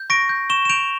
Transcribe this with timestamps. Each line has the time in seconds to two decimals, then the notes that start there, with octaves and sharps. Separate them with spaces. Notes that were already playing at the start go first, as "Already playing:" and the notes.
Already playing: G6
0.10 C#6 A#6 D7
0.29 G6
0.50 C#6 E7 G7
0.65 E7
0.70 G6 D7 F7